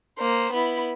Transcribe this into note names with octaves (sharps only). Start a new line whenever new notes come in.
A#3 C5
B3 E4